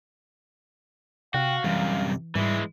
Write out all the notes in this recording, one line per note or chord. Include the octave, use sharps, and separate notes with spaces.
C3 F#4 F5 G5
F#2 C3 E3 G3
G#2 E3 G3 G#3 E4